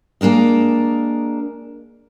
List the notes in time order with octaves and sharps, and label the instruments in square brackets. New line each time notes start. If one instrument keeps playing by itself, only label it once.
[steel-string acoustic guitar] G#3 A#3 D4 A#4 D#5